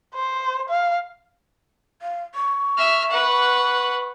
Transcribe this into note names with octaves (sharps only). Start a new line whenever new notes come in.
C5
F5
F5
C#6
E5 F6
B4 F#5